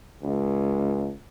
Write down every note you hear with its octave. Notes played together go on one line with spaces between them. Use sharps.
C#2